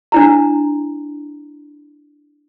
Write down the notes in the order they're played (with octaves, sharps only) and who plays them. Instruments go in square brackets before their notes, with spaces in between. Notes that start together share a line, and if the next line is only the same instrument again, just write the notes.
[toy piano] D4 E4 A#5